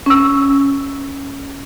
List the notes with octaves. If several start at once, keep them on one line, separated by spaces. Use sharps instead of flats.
C#4 E6